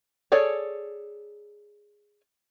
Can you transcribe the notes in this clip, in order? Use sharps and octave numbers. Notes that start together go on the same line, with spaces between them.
G#4 A4 C#5 D5